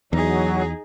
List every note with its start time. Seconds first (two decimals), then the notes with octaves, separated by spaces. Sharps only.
0.13 E2 F#3 D#4 G#4